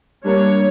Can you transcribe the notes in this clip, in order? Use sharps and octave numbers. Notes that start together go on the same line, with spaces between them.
G3 A#3 D4 C#5